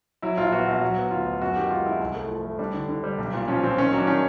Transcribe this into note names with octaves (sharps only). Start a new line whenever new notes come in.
F#3 E4
A#1 F4
B3 F#4
A#1
F#3
B3
D2 F4
B3
F#2 F#4
D#3 G4
G#3 F4
D#3 E4
C2 E4
A3
F3
A3
G3 D4
D3
D3
G3
B1
A#2
F3 C#4
F3 C4
D#3 C#4
F#3
D4
D#3 C#4